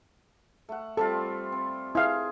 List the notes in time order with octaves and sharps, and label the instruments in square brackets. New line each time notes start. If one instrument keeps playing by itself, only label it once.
[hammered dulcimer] A3 F#5
[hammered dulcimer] G3 C4 F4 [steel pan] A4
[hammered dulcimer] C4
[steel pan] E4 F5 [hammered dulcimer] G#4